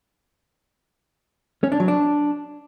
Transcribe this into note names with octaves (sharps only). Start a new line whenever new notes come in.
C#4
D4
F#3
D4